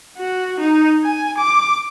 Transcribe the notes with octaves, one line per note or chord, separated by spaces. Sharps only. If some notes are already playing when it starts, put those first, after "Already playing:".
F#4
D#4
G#5
D6